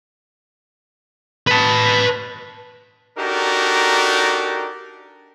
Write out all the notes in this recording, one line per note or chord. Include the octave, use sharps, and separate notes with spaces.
B4 A5
D4 D#4 F#4 G4 A4 A#4